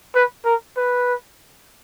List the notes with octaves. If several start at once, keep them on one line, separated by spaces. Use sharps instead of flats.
B4
A#4
B4